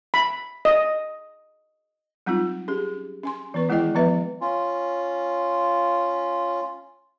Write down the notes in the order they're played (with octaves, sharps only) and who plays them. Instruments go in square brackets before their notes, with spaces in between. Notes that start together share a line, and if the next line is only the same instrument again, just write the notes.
[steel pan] B5
D#5
[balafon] F#3 G3 C4 D#4 F4
C#4 G4 G#4
C#4 G#5 C6
E3 B3 B4 C#6
D#3 G#3 E4 G#4 D#5 G5
F3 B3 B4 E5
[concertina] C#4 F4